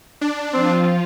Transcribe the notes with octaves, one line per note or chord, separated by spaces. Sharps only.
D4
F3 C4 F4